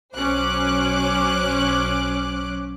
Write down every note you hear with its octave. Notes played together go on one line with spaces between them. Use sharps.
B1 F#3 C#4 C5 D6 F#6